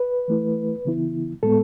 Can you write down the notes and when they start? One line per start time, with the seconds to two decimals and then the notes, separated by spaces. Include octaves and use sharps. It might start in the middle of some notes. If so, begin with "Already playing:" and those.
Already playing: B4
0.28 E3 A3 E4
0.85 C#3 E3 B3 E4
1.43 A2 G#3 B3 A4